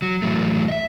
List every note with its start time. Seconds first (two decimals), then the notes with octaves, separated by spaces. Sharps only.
0.02 F#3
0.22 A2 E3 F#3 A3
0.68 D#5 E5